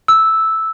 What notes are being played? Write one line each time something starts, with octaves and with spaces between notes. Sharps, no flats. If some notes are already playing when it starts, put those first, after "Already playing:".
E6